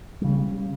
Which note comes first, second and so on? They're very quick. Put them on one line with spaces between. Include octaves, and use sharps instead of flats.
G3 C#3 C#4